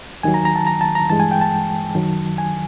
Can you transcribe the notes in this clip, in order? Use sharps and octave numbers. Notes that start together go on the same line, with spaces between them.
D#2 D#3 F#3 G#5
A#5
A#5
A5
A#5
A5
A#5
G2 E3 G#3 A5
G#5
G5
A5
F#2 D#3 F#3
G#5